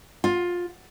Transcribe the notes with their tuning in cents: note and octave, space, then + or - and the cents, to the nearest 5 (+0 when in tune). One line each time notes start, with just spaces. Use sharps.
F4 +15